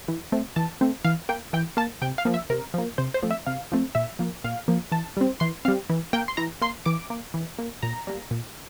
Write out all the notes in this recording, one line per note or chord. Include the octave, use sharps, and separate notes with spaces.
E3
A3 C4
E3 A5
A3 C4
E3 F5
A#3 G5
E3 G5
A#3 A5
C3 G5
F5
F3 A#3
E5
C3 A#4
F3 A#3
C3 C5
C5
F3 A3 C4
E5
C3 F5
F3 A3 C4
A#2 E5
F3 A#3
A#2 F5
F3 A#3
E3 A5
G3 C4
E3 C6
G3 C4 F5
E3
A#3 G5
C6
E3 A#5
A#3 C6
E3 D6
A#3
E3
A#3
A#2 A#5
G3 A#3
A#2